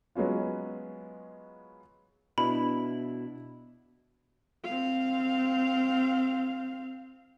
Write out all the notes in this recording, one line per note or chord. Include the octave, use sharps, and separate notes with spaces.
F#3 G#3 B3 C#4 F4
B2 D4 E4 B5
C4 F5